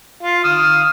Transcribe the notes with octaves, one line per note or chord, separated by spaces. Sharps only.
F4
D#6 F6